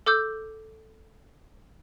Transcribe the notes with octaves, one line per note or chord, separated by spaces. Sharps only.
A4 D6 E6 G6